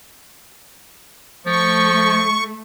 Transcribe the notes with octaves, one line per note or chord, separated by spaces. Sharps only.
F3 A3 C#6